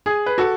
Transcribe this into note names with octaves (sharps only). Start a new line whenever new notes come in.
G#4
B4
F#4 A4